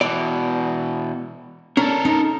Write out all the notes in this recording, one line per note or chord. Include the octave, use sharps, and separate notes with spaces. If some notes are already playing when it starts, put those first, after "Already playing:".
B2 E3 D5
C#4 D4 A4 A#4
C#4 D#4